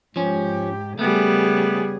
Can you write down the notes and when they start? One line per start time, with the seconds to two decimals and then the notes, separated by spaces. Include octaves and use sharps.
0.16 G#2 F3 C#4 G4
0.99 C#3 G3 A3 B3 G#4